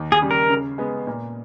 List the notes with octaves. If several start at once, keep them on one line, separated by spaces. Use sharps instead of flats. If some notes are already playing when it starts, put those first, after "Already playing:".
Already playing: D#2
G#4
C#3 G3
A#4
C#3
G#3 B3
A#2